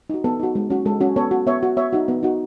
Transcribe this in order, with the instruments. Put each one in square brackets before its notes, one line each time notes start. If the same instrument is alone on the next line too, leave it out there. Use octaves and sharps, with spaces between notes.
[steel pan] D#4 F#4
B3 A4
D#4 F#4
G#3
C#4 F#4
G#3 A4
C#4 F#4
B3 A4 C#5
F#4
B3 C#5 E5
F#4
B3 C#5 E5
D#4 F#4
B3
D#4 F#4